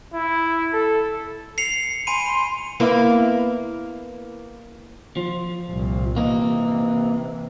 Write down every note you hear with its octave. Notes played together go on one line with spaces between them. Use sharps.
E4
A4
C7 C#7 F7
G#5 B5 C6 D#7
A#3 B3 E4
F3
C2 A#2
C3 E3 A#3 D#4